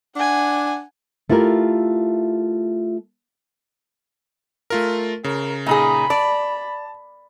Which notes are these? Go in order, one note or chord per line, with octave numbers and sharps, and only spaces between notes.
D4 F#5 G#5
A3 E4 F4 G4 A#4
A3 F4 A#4
C#3 A#4
A#2 D#4 G#4 B5
D5 A5